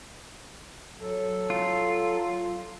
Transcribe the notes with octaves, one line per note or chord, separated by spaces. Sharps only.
F#3 A4
F4